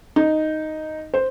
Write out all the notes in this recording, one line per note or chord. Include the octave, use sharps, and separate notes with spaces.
D#4
C5